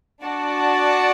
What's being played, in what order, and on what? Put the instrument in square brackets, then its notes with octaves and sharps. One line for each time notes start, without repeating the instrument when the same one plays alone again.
[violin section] D4 F#4 D5 F#5 A5